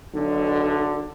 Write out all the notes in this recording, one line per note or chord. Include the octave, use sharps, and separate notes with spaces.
B1 D3